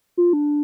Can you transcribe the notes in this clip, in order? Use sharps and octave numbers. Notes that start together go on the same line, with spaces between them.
F4
D4